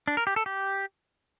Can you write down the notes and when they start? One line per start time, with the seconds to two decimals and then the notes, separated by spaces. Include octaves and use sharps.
0.08 D4
0.17 A#4
0.27 G4
0.36 A4
0.46 G4